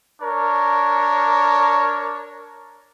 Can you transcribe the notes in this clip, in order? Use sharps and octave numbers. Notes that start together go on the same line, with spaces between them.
D4 A#4 C#5